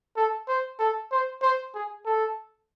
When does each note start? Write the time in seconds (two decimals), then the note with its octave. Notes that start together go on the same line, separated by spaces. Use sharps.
0.16 A4
0.48 C5
0.79 A4
1.11 C5
1.42 C5
1.74 G#4
2.06 A4